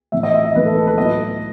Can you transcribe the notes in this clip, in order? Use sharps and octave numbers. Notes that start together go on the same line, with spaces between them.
A2 E3 B3 D#4 E5
D#5
E5
D#5
A2 E3 B3 D#4 B4
A4
A4
B4
A2 F#3 B3 E4 D#5